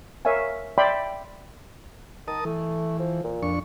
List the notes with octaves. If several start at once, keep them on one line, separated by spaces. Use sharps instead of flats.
A#4 C#5 E5 F5 G#5
D5 E5 G5 B5 C6
D#3 A#4 A5 D#6
E3 A3
F3
A#2
F2 D4 C#6